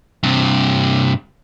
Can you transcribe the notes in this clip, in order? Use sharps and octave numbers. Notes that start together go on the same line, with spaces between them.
G2 C3